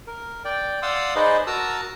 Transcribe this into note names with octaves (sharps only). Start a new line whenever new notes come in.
A#4
D5 G5
D5 F5 F#5 C6 D#6 E6
D#4 G#4 B4 C5 D5 D#5
F#4 A#4 A5 A#5 D#6 E6